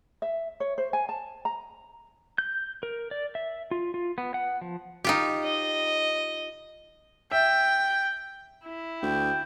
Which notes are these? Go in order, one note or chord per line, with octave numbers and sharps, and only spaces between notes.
E5
C#5
C5
G#5
A5
A#5
G6
A#4
D5
E5
F4
F4
B3
F#5
F3
D#4 F4 G4
D#5
E5 G5
E4
D2 G5